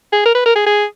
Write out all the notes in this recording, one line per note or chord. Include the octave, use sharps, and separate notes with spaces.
G#4
A#4
B4
A#4
G#4
G#4